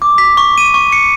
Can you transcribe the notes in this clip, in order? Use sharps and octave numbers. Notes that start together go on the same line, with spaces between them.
D6
B6
C#6
D#7
C#6
C#7